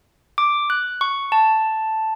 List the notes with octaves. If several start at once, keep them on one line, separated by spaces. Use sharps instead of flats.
D6
F#6
C#6
A5